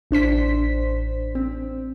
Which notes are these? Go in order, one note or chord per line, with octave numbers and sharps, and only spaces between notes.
A1 D4 C5 B6
C4